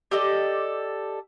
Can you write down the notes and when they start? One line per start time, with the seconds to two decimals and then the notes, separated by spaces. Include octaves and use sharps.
0.11 G4 A4 D5 D#5